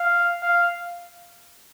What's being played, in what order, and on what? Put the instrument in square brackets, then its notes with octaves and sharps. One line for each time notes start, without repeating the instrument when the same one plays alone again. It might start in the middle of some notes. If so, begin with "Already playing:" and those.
Already playing: [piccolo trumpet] F5
F5